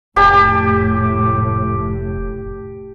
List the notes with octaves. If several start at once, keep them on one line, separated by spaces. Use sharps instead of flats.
F1 A2 G4 G#5 A5